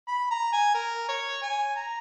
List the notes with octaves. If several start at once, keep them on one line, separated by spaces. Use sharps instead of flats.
B5
A#5
G#5
A#4
C#5
G#5
A#5